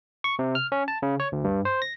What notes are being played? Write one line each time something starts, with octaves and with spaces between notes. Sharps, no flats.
C#6
C3
F6
C#4
A5
C#3
C#5
D2
G2
C5
A#6